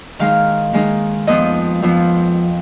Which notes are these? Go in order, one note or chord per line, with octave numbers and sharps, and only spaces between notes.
D#3 G#3 D#4 F5
D#3 G#3 D#4
F2 F3 B3 D#5
F2 F3 B3